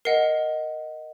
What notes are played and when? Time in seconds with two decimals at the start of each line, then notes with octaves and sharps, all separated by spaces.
0.05 A#4 D#5 F#5 C7